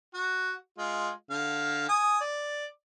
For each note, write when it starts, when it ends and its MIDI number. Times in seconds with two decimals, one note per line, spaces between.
0.14 0.54 66
0.78 1.10 56
0.78 1.10 65
1.30 1.85 50
1.30 1.85 77
1.89 2.18 80
1.89 2.18 87
2.21 2.66 74